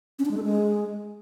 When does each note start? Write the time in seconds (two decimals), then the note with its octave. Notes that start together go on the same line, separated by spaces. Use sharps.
0.19 C#4
0.25 D4
0.31 G#3
0.37 A4
0.43 G#3